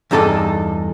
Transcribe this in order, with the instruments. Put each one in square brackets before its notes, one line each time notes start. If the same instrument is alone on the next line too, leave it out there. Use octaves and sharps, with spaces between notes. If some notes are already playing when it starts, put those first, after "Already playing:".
[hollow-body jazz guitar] E2 G2 D#4 A4 D5 A5